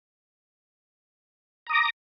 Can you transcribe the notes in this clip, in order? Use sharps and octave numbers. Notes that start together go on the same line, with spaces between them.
A#5 D6 D#6 A#6